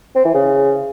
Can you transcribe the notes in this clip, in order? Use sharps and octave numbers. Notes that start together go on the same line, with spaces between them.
C4
E3
C#3